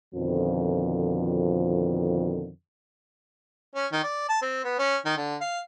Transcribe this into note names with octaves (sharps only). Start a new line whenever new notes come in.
F2 B2 D3 D#3 F3
C#4
D#3
D5
A5
C4
B3
C#4
D#3
D3
F5